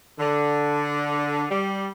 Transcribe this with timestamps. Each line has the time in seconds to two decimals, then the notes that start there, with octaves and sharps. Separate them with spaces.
0.19 D3
1.50 G3